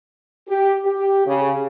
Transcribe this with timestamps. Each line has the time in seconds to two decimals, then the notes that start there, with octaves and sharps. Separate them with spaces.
0.48 G4
0.84 G4
1.26 C#3